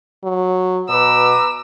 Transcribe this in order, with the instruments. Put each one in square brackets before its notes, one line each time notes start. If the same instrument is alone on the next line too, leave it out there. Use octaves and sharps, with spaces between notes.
[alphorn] F#3
[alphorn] B2 [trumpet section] B4 A#5 D6 [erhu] E6